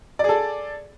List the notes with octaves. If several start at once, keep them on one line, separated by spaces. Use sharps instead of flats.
G#4 A4 D5